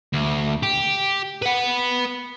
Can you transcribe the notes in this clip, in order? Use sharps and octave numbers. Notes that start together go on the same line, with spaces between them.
D2
G4
B4 F#5